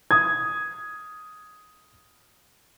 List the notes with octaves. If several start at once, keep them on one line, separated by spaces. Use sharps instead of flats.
D#6 G#6